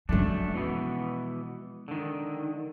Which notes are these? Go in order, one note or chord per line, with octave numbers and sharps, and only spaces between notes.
F#2 F3 G#3 A3 D4
B2 E3 B3
D3 D#3